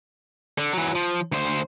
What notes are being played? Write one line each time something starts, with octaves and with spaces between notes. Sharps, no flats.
D3
E3 F#3
F3
D2 C5